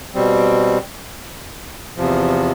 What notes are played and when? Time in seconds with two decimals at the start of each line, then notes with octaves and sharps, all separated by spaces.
0.15 B2 G3 C4
1.97 E2 C3 F3